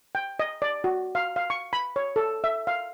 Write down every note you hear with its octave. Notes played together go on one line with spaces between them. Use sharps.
G5
D#5
D5
F#4
F5
F5
C#6
B5
C#5
A4
E5
F5